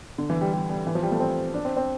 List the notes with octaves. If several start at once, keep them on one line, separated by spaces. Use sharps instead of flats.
D3
E3
G3
G3
G3
E3
F3
G3
A3
C4
D4
C4
C4